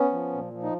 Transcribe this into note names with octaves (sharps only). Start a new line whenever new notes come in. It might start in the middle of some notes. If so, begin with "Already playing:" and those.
Already playing: B3 C#4
F3
A#2
F3
D#4